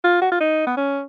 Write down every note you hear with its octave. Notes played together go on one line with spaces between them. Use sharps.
F4
F#4
F4
D#4
B3
C#4